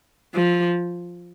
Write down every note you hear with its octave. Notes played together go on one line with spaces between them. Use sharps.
F3